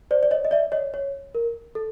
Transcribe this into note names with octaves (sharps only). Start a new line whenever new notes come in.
C5 D5
D5
C#5 D#5
D#5
D5 E5
C#5 D#5
C#5
A#4
A4